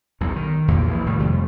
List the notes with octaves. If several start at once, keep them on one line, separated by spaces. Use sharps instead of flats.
B1 E2 G2
D#3
B1 E2 A#2 A#3
A#1 E3
F1 A2 D#3 G3
F2 C3 G3 A3